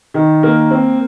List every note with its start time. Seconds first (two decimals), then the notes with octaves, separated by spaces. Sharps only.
0.14 D#3
0.43 A#3
0.71 C4